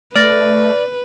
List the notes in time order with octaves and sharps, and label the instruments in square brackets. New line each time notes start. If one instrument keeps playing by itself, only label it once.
[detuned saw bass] A3 [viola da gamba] B4 [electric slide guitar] D5 [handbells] F6 A6 A#6